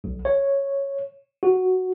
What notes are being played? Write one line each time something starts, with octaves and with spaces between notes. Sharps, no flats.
B1
C#5
F#4